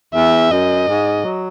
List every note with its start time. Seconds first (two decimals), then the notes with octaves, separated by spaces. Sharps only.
0.15 E2 E5
0.51 F#2 D#5
0.88 G#2
1.24 F#3